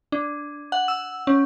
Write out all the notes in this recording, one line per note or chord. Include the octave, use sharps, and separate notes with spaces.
D4
F#5
E6
C#4